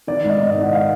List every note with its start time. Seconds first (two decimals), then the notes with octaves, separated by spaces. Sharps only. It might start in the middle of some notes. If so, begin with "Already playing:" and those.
0.07 D#3 D5
0.24 G#2
0.29 D#5
0.40 G#2
0.50 D#5
0.56 D#3
0.63 F#5
0.73 F5